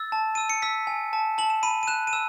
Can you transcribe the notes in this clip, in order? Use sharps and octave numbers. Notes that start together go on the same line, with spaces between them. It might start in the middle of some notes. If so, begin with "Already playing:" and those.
Already playing: E6 A6
A5
E6 D#7
C#7
E6 B6
G#5
A5
A5 F#7
E7
B5 D#7
D#7
F#6 E7
D#7
E6 E7